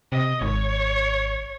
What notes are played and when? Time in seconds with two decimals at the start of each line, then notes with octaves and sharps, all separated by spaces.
0.12 C3 D#5
0.41 G#1 C#5